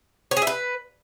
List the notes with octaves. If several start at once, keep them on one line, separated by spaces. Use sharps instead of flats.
C#5
G#4
E5
B4